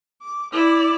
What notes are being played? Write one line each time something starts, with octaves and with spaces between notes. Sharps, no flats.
D6
E4 D5